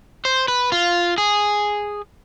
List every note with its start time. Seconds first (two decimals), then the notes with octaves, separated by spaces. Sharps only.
0.25 C5
0.48 B4
0.72 F4
1.18 G#4